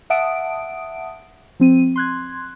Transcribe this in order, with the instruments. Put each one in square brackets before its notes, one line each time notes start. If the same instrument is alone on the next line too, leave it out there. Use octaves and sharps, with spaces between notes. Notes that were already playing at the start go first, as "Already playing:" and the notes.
[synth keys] E5 F#5 A5 D#6 D7
F3 C4 D#7
C6 F#6 G#6